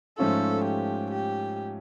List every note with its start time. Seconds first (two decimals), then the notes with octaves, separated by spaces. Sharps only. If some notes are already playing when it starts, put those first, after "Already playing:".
0.18 G#2 F3 A3 C#4 F4 A4
0.65 G4
1.11 G4